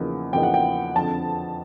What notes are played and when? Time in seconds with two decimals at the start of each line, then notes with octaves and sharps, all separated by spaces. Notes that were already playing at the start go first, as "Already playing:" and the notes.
Already playing: E2 C#3 F3 A#3 D#4
0.33 E2 C#3 F3 A#3 D#4 G5
0.43 F#5
0.54 G5
0.95 F2 D3 F3 A5